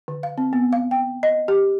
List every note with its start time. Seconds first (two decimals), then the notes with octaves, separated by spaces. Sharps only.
0.08 D3
0.23 F5
0.38 C4
0.53 B3
0.73 F5
0.91 G5
1.23 D#5
1.48 G4